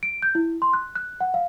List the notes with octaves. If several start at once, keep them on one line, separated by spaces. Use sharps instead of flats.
D7
G6
E4
C6
F#6
F#6
F#5
F5